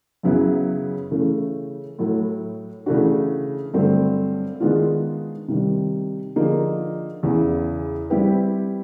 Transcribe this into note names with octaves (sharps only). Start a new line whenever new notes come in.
F#2 C#3 F#3 B3 E4
C#3 E3 A3 C#4
A2 F#3 A3
C#3 E3 A3 D4 F#4
G2 D3 F#3 A3 C4
D#3 G#3 B3 D4 F4
C3 D#3 G3
D3 F3 A#3 D#4 G#4
E2 C#3 E3
G3 C4 E4 G4 B4